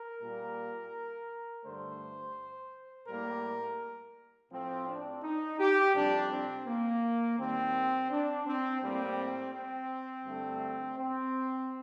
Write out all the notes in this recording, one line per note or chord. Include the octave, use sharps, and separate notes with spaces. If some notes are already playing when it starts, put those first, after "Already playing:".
Already playing: A#4
A#2 G3 A#3
G2 D3 A3 C5
A2 G3 A#3 A#4
A2 F3 A3 C4
D4
D#4
G4
F2 C3 G3 D4
C4
A#3
D#2 D#3 G3 A#3 C4
D4
C4
A2 G3 A#3 C4
C4
G2 D3 A3
C4